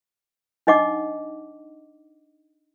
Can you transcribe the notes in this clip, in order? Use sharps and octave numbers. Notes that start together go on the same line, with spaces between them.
D4 D#4 D#5 F#5 D6